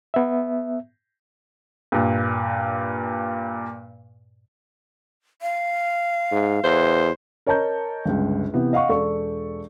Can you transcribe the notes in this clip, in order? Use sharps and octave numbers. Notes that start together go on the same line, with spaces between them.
B3 E5
G2 A#2
F5
G#2
E2 C5
A#4 C#5 D#5 A5 A#5 G6
G1 C#2
C3 E3 B3
D#5 F5 F#5 C#6
E1 A4 D5 C#6